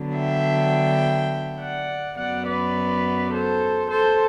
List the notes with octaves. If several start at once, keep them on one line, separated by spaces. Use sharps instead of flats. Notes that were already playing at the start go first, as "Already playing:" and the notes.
Already playing: D3 F#3 B3 D4
E5 G5
D5 F#5
F#2 F#3 B3 D5 F#5
B4 D5
A4 C5
A4 C5